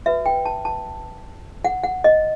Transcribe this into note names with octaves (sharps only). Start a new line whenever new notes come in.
F#4 B4 E5
G5
A5
A5
F#5
F#5
D#5